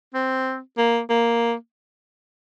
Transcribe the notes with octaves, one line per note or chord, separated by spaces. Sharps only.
C4
A#3
A#3